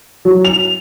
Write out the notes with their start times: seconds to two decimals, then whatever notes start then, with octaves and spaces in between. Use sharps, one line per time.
0.25 F#3
0.45 F7